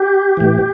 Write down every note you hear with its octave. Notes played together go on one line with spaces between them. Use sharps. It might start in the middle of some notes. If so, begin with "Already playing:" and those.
Already playing: G4
A2 E3